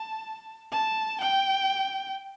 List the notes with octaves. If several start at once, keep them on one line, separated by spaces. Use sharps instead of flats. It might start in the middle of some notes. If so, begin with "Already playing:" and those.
Already playing: A5
A5
G5